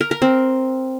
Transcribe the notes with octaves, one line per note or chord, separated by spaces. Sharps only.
A#4
A#4
C4